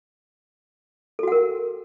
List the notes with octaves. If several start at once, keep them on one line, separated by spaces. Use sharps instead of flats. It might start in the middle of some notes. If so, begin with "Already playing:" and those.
F#4 A4 A#4 F#5